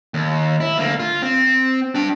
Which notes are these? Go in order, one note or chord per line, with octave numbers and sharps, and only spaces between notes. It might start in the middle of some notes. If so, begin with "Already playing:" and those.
D#2
E4
D2 A#3
F4
C4
D4 G5